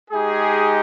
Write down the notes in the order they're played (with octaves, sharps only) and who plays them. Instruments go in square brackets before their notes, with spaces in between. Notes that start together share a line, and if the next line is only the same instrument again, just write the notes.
[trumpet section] G#3 D#4 G4 G#4